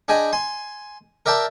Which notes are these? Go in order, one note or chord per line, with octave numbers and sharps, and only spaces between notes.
D4 G#4 D#5 G5 G#5 B5
G#5 C6
A#4 D5 E5 G5 A5